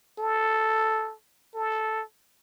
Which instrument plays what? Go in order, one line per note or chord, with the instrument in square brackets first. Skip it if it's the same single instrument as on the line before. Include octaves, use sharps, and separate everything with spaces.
[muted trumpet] A4
A4